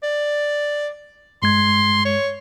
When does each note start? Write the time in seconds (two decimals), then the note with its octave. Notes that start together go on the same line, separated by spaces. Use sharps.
0.03 D5
1.42 G2 G#3 C6 G#6
2.05 C#5